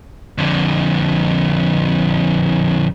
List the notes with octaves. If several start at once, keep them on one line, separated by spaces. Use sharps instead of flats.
F2 D3